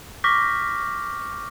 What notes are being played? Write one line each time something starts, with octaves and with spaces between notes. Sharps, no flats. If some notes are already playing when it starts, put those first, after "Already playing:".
C#6 D6 F6 G6 A#6 B6